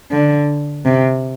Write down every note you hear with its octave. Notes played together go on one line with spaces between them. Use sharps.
D3
C3